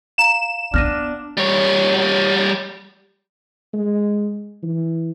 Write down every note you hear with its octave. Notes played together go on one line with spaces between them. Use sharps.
F5 A#5 E7
B3 D4 F6 A#6 D#7
G3 C#5
G#3
E3